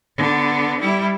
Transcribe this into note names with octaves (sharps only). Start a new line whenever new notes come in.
D3 B3
G3 E4